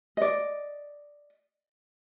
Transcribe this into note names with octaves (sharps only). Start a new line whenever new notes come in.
D5 D#5